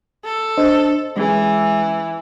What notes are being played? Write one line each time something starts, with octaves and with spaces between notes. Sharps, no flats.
A4
D4 C5 D#5
E3 G#3 C#4 G#4